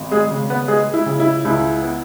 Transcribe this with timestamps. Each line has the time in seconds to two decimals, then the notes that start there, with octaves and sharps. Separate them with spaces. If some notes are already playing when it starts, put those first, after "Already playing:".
Already playing: G#1
0.11 G#3 G#4
0.31 C#3
0.50 B3 B4
0.68 G#3 G#4
0.94 E4
1.06 C#3
1.20 E4
1.45 C#2 E4
1.82 B3